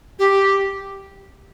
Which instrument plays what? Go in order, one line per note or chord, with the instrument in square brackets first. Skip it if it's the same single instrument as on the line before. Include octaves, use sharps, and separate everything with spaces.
[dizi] G4